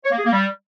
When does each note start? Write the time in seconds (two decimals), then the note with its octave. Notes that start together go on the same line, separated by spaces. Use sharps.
0.04 C#5
0.11 A#3
0.18 G#4
0.25 A#3
0.32 G3